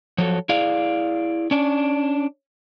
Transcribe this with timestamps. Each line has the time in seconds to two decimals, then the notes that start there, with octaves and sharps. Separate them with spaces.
0.18 F3 F#3 A4
0.49 E4 G#4 D5 F5
1.51 C#4 D4